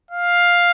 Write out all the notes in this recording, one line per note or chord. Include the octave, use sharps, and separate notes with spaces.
F5